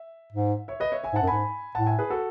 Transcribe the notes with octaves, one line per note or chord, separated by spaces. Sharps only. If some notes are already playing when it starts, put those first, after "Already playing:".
Already playing: E5
G#2
C#5 E5
B4 D#5
C#5 E5
E5 G#5
G#2 F#5 A5
F#2
G#2 G#5 B5
A2 F#5 A5
E5 G#5
G#4 B4
F#4 A4